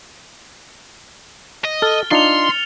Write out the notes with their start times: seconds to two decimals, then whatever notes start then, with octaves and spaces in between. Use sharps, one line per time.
1.64 D#5
1.82 A4 F6 A6 G7
2.11 D4 D#4 F4 C6 A6 C#7 F7